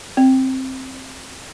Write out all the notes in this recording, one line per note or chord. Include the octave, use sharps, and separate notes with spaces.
C4